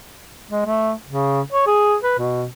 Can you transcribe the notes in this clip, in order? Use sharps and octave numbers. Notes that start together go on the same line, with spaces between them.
G#3
A3
C#3
C#5
G#4
B4
B2